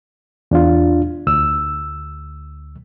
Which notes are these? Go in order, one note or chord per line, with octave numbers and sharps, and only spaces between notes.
E2 D4 F4
D2 E6